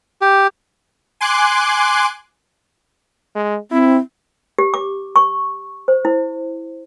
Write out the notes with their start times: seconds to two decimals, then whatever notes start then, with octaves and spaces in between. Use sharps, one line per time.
0.22 G4
1.21 G#5 C6 D6 F#6
3.35 G#3
3.71 C4 E4
4.58 G4
4.74 D6
5.16 C#6
5.88 C5
6.05 E4